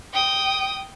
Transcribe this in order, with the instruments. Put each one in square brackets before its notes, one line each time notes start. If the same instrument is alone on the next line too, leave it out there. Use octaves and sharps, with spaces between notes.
[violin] G5 D#6